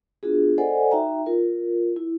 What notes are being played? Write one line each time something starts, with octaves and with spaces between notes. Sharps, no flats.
B3 D4 F4 F#4 G#4
A4 C5 D5 D#5 F#5 G#5
D#4 F#4 E5 G5 A#5
F4 A#4
E4